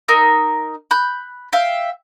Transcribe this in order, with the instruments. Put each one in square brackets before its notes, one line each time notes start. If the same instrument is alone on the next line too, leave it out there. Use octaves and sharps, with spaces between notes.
[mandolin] D#4 A#4 E6
B5 F#6 G6
E5 F5 G5